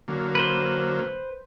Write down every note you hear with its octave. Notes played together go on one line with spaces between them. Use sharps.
D3 F#3 A#3
B4 C5